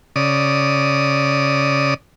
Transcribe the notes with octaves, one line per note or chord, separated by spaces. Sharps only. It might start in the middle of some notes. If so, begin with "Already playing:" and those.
C#3 D5 D#6